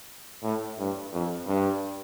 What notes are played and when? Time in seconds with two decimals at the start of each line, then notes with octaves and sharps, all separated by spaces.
0.43 A2
0.79 G2
1.13 F2
1.47 G2